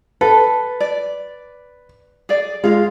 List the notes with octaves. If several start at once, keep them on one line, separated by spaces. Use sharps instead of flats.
A4 B4
D5
G#4 D5
G#3 F4 F5